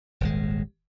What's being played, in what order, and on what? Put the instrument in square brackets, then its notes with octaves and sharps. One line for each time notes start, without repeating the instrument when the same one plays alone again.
[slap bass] D#1 G#1 G#3